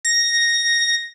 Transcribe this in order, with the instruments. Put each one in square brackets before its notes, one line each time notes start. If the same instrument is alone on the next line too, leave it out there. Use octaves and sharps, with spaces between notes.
[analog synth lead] A#6